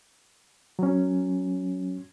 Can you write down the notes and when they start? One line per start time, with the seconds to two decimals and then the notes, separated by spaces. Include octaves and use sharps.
0.79 F#3 C#4